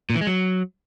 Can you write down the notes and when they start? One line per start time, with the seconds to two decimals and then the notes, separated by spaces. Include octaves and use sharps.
0.10 A#2
0.15 E3
0.21 G#3
0.27 F#3